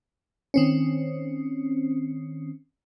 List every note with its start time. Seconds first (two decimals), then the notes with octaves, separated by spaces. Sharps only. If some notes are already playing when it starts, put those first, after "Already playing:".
0.54 D#3 C4 C#4